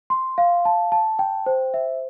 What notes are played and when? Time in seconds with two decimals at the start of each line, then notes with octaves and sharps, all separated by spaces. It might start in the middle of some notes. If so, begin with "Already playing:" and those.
0.10 C6
0.38 F5
0.65 A5
0.92 A5
1.19 G5
1.46 C5
1.74 E5